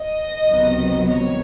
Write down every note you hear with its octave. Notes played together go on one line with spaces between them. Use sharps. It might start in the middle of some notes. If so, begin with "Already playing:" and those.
Already playing: D#5
C#2 C3 D#3 F#3 B3
C#5